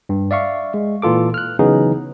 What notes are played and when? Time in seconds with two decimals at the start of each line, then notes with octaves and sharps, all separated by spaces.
0.09 G2
0.31 D5 E5 F5 C#6
0.74 G#3
1.02 A#2 E3 F4 A4 D6
1.34 F6 F#6
1.59 C#3 E3 F#3 B3 D#4 G#4